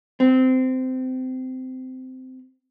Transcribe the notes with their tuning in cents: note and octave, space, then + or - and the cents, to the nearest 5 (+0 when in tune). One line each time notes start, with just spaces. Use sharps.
C4 -20